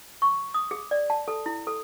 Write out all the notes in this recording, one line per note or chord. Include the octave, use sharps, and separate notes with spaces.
C#6
D#6
G#4
D5
A5
A4
E4
A4